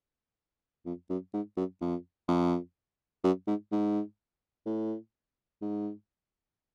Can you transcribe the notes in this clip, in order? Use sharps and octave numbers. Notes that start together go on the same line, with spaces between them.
F2
F#2
G#2
F#2
F2
F2
F#2
G#2
G#2
A2
G#2